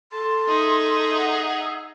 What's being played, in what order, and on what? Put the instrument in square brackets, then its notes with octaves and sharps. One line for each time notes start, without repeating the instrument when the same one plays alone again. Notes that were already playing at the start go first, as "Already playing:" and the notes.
[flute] A4 [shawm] A5 [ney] C6
[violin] D#4 E5 [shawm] G#4
[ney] F#5
[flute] E6